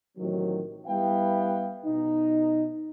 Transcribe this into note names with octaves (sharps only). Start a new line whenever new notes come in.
A1 C3 D#3 F#3
G3 B3 E4 B4 F5 G5
B2 D#4